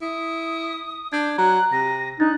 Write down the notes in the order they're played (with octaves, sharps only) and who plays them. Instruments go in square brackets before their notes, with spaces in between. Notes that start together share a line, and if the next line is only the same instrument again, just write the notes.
[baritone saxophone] E4 [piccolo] D#6
[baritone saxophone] D4 [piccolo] G6 [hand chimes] G#6
[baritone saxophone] F#3 [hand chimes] A#5 [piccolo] F#6
[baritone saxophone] C3 [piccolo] A#6
[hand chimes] D4 A6 [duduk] D#4 [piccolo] F#6